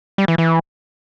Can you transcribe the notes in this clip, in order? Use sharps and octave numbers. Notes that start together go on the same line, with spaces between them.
G3
E3
E3